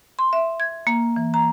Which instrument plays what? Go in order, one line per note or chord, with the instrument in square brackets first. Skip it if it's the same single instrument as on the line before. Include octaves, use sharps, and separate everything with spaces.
[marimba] C6
E5
G#6
A#3
E3
A#5